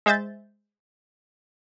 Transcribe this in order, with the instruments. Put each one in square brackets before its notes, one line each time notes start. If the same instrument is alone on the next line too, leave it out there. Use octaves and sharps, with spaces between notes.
[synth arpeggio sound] G#3 C5 E5 G6 A6